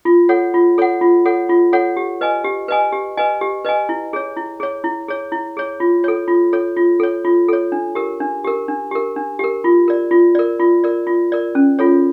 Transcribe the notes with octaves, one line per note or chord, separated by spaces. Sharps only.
F4
A4 C#5 F#5
F4
A4 C#5 F#5
F4
A4 C#5 F#5
F4
A4 C#5 F#5
G4
B4 D#5 G#5
G4
B4 D#5 G#5
G4
B4 D#5 G#5
G4
B4 D#5 G#5
E4
G#4 C#5
E4
G#4 C#5
E4
G#4 C#5
E4
G#4 C#5
F4
A4 C#5
F4
A4 C#5
F4
A4 C#5
F4
A4 C#5
D4
G4 A#4
D4
G4 A#4
D4
G4 A#4
D4
G4 A#4
F4
A#4 D5
F4
A#4 D5
F4
A#4 D5
F4
A#4 D5
C#4
F4 A4 C#5